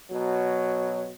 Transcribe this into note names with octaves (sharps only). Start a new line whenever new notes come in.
B2 F#3